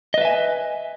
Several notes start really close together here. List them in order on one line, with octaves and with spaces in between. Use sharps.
D#5 B4 E5 G#5